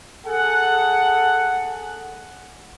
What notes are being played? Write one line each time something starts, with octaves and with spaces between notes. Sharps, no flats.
G#4 A4 F#5